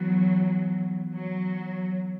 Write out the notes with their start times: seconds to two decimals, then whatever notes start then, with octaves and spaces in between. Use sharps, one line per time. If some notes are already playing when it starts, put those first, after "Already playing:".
Already playing: E3 F#3 B3
1.13 F#3